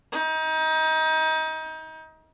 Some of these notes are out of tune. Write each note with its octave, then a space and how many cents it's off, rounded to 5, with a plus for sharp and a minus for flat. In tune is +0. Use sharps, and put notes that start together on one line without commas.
D#4 +30